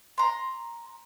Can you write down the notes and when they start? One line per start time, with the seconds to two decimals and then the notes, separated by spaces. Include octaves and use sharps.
0.18 A#5 C6